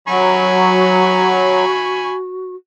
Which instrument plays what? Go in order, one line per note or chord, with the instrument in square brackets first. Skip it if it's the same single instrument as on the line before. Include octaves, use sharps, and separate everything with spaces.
[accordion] F#3 [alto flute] F#4 [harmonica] G#5 B5 C#6